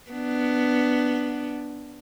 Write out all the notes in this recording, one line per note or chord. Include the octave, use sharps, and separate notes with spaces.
B3 D4